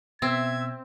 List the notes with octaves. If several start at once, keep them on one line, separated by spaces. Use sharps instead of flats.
B2 C4 E5 E6 G#6